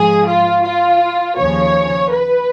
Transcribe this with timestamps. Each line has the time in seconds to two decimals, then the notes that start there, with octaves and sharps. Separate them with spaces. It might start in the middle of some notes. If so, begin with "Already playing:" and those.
Already playing: G#2 F3 G#4
0.27 F4
0.63 F4
1.37 D#2 C#3 F3 C#5
2.11 B4